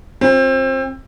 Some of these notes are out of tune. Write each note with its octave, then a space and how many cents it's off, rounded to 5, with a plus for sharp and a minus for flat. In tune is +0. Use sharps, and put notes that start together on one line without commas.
C4 +25 F4 +30